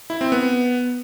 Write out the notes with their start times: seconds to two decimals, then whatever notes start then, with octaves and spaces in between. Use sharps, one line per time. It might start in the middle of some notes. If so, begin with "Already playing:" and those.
0.10 E4
0.21 C4
0.32 B3